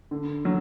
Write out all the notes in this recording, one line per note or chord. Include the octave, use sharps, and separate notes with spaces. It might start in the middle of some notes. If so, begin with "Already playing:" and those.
D3
F#3